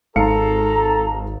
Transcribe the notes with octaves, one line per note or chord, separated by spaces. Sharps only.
G#1 G#2 A4 F5 A#5 C#7